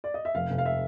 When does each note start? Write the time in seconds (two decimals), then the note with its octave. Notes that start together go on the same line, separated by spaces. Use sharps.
0.04 D5
0.14 D#5
0.25 E5
0.35 F1 F5
0.50 F1
0.58 F5
0.66 E5